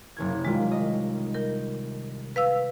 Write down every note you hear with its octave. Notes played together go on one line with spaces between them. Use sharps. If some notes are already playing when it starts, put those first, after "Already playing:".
F#1 C2 G#6
D#3 G3 G#3 F4
D#5
A#4 G6
B4 F5 E6